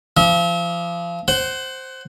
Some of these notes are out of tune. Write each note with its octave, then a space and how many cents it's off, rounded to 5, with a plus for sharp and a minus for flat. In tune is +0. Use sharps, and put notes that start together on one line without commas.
F3 -30 E5 -35
C5 +0 F#5 +25